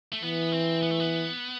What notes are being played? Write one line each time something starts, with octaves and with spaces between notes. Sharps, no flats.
A3
E3 B3
C4
B3
A3
B3